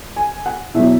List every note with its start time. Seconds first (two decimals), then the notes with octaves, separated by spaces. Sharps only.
0.16 G#5
0.46 F#5
0.74 E2 B2 F#3 E5